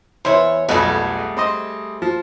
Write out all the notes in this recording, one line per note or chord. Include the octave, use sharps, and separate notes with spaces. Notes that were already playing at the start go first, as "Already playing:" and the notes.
E2 E4 C5 C#5
B1 F2 G3 A3 G#4
C4 C5 D#5
F3